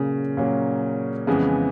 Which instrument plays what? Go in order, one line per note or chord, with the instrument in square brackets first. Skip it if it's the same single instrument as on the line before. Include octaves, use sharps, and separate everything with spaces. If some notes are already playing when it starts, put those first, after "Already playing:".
Already playing: [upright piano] A#2 F#3 A#3 C#4 [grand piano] C#3
[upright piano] A#2 F#3 A#3 C#4
F2 C#3 E3 G#3 B3